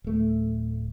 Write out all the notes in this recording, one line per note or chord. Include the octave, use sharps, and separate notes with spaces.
D1 A3